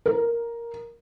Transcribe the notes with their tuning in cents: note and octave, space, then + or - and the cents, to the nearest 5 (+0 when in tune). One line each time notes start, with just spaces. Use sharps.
A#4 +5